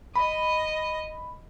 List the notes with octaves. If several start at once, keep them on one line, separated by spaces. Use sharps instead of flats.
D#5 B5